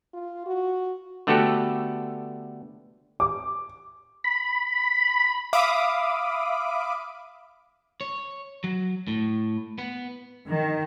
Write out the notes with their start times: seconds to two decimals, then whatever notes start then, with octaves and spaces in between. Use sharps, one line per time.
0.14 F4
0.46 F#4
1.27 D3 A3 B3 F#4 G4 A4
3.20 D6
4.24 B5
5.53 E5 F5 B5 D6 D#6
8.01 C#5
8.64 F#3
9.08 A2
9.79 B3
10.47 D#3